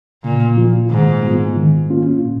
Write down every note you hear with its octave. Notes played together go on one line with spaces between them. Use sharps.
A#2 C#3
F3 A#3 F4
G#2 D#3
G#3 B3 F4
D#3
A#3 C#4 F4
A#2